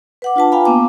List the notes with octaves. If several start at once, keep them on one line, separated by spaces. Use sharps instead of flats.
B4 F#5 D6
D4 F4 B4 A5
F4 F5 G5 G#5 A#5 B5
A#3 B3 F5 D6